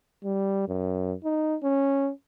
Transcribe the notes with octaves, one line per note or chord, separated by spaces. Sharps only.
G3
F#2
D#4
C#4